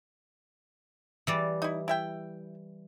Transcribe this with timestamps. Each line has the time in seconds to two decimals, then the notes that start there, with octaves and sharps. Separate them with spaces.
1.27 E3 G3 D5
1.62 D#4 E4
1.88 E4 E5 G5